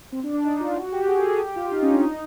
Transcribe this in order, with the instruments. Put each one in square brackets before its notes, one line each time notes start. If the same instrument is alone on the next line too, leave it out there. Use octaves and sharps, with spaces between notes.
[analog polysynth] C4
D4
D4
D#4
F4
F#4
G4
G#4
A4
G#4
G4
F4
D#4
C#4
D4
D#4